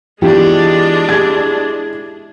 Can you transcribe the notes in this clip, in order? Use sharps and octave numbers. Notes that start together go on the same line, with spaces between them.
E3 G#3 B3 D4 F4 G4
E4 G4 G#4 G#6